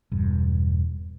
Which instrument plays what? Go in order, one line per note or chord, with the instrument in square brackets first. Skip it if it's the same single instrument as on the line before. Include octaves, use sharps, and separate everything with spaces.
[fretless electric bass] E1 G2